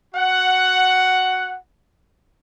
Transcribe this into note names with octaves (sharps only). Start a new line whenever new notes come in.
F#4 F#5